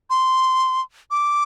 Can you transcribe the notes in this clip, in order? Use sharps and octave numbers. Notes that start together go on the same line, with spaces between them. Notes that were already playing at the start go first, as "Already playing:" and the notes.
C6
D6